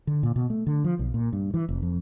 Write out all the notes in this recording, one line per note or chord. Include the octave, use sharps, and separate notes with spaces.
D3
A#2
B2
A3
D3
F3
B1
A#2
G2
E3
F1
F2